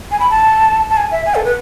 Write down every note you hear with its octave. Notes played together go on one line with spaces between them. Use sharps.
G#5
B5
A5
A5
G#5
E5
G#5
A4
B4